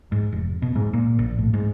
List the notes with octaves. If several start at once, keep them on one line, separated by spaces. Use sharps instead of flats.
G#2
F1
B2
G#2
A#2
A#1
A2
G#2